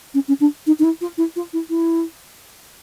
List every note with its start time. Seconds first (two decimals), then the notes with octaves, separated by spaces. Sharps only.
0.14 C#4
0.28 C#4
0.40 D4
0.67 D#4
0.79 D#4
0.84 E4
1.01 F4
1.18 E4
1.36 F4
1.53 E4
1.70 E4